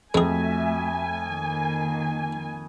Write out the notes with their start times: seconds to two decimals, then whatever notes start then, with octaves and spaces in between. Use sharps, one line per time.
0.14 F2 G#3 A3 F#4 G#4 E5 G#5
1.23 D#3 A#3